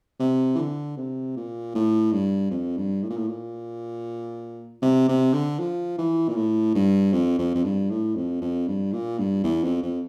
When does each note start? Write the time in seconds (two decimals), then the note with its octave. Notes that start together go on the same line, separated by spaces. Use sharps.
0.20 C3
0.55 E3
0.58 D3
0.97 C3
1.36 A#2
1.75 A2
2.12 G2
2.51 F2
2.77 G2
3.03 A2
3.10 A#2
3.17 A2
3.28 A#2
4.82 C3
5.08 C3
5.33 D3
5.59 F3
5.98 E3
6.28 A#2
6.36 A2
6.75 G2
7.13 F2
7.39 F2
7.55 F2
7.64 G2
7.90 A2
8.15 F2
8.42 F2
8.68 G2
8.93 A#2
9.19 G2
9.44 E2
9.64 F2
9.83 F2